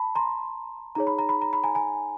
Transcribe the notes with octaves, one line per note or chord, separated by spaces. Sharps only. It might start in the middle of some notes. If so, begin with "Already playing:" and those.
Already playing: A5 B5
A#5 C6
D#4 G#4 C#5 A#5
B5
A#5
B5
A#5
B5
G#5 A#5
G#5 A#5